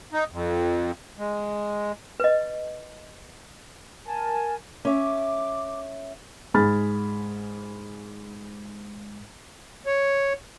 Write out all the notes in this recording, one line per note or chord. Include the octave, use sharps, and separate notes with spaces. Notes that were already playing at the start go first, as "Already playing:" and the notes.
D#4
F2
G#3
B4 D#5
A#4 G#5 A5
C#4 E5 D6
G#2 G#4 B5 F6 A6
C#5